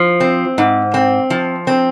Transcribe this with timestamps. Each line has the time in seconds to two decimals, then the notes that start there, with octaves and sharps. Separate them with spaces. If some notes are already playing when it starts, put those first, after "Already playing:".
Already playing: F3
0.20 C4
0.58 G#2
0.94 C4
1.30 F3
1.67 C4